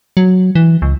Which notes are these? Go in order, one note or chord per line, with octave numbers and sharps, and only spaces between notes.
F#3
E3
C#2